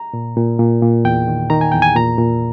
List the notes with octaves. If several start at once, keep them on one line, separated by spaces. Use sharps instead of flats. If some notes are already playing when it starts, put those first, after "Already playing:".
Already playing: A#5
A#2
A#2
A#2
A#2
E2 G5
D#3
D#3 A#5
G#5
E2 G5
G#5
A#2 A#5
A#2